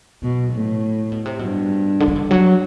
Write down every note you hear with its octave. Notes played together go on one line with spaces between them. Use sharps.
B2 F#3
A2
C3
B2
C3
G2 B2
D3
E3
D3
F#3